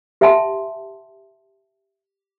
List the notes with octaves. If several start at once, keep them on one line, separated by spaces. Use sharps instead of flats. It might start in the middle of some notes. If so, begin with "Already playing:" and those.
G4 E5 F#5 G#5 A5 C6